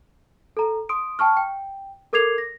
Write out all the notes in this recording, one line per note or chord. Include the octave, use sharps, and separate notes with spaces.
A4 A#5
C6 D#6 D7
G5 A5 C#6 F6
G5
A4 A#4 D6 G#6 C7 F7
A#6